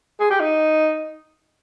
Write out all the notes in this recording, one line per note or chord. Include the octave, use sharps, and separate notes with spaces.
G#4
G4
D#4